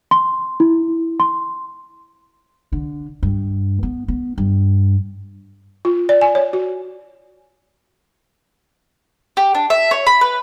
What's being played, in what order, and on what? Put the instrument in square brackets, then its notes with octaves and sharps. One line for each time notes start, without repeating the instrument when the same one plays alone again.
[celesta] C6
E4
C6
[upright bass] D3
G2
B3
B3
G2
[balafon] F4
D5
G#5
C#5
F#4
[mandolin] G4
D4
E5
C#5
B5
B4